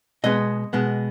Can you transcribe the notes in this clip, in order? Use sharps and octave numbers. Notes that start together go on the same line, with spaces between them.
B2 G#3 B3 D#5
B2 G#3 B3